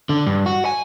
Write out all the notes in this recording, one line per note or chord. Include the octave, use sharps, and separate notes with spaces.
D3
G2
F#4
G#5